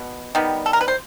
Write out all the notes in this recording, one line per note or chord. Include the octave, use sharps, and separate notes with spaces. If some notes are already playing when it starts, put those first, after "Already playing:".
Already playing: B2 B3
D#3 G3 B3
A4
A#4
B4
C5